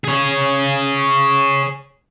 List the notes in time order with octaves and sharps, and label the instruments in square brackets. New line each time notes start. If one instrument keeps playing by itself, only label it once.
[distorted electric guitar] G#4 C#5